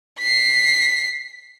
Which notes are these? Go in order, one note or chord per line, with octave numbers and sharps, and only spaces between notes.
B6 C7